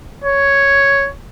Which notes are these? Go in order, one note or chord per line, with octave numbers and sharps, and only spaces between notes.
C#5